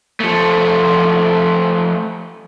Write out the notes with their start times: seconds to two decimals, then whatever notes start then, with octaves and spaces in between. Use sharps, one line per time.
0.20 F3 A3